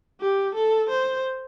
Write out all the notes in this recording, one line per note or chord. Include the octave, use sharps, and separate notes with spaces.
G4
A4
C5